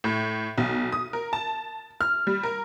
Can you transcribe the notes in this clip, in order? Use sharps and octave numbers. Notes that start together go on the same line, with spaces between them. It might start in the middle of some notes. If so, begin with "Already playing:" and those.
A2
B1
D#6
A#4
A5
F6
G3
A#4